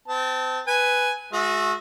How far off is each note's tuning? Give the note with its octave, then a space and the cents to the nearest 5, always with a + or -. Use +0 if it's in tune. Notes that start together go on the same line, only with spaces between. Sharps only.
C4 -30 A5 +0
B4 +0 G#5 +0
G#3 +5 F#4 -30 E5 +0